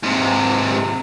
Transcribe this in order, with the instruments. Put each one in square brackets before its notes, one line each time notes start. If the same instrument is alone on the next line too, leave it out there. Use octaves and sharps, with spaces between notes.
[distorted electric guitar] G#2 C3